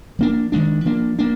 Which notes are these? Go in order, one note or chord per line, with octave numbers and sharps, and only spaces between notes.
F3 A#3 D4
D#3 G#3 D4
F3 A#3 D4
A#3 D4